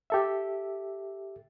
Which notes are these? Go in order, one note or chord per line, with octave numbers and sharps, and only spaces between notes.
G4 A4 E5